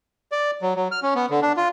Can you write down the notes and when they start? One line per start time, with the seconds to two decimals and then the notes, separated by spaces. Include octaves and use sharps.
0.32 D5
0.62 F#3
0.76 F#3
0.91 F6
1.03 C#4
1.15 B3
1.30 D3
1.42 D4
1.57 F4